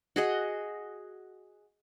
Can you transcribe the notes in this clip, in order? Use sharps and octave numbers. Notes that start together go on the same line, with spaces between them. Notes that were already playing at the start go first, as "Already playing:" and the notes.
F#4 G#4 D#5